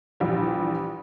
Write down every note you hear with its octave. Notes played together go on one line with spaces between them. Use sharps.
A#1 E2 F3 G3